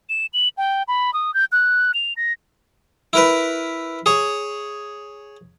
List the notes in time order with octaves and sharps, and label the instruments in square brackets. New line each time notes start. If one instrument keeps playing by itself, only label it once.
[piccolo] E7
F#7
G5
B5
D#6
G6
F#6
F7
A#6
[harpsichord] E4 A#4 B4
G#4 C#5